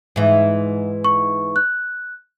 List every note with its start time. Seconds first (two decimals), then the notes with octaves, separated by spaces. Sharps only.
0.16 G#2 E3
1.05 C#6
1.56 F#6